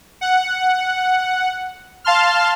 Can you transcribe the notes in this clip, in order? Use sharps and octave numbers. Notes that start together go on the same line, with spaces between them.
F#5
F5 A5 C6 F6